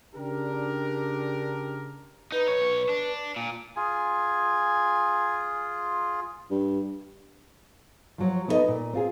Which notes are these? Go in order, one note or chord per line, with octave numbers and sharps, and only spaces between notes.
C#3 D4 G4 A#4
D#4 B4
B1 C#5
D4
A#2
F4 G#4 G#5
G2
F3 F#3 C#5
B3 D#4 E4 A4 D#5
A#2
C4 F4 G#4